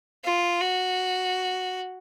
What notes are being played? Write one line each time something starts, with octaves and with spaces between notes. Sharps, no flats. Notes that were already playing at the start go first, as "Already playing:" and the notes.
F4
F#4